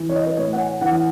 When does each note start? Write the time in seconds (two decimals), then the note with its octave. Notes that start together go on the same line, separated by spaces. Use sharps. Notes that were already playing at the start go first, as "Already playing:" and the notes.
Already playing: E3
0.09 C#5
0.16 D#5
0.26 B4
0.37 A2 C#5
0.53 F#5
0.60 G#5
0.81 E3 F#5